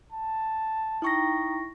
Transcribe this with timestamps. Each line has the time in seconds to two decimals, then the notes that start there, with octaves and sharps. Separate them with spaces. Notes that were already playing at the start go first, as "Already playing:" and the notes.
0.12 A5
1.02 D#4 E4 G5 A#5 C#6 A#6